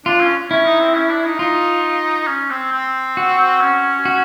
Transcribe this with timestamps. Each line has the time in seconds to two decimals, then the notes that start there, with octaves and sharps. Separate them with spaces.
0.05 D4 F4
0.21 C#4
0.50 C#4 E4
0.65 D#4
0.80 C4
0.95 C#4
1.10 D4
1.24 D#4
1.39 D#4 F4
2.27 C#4
2.50 C4
2.72 C4
3.17 F#4
3.61 C#4
4.05 F#4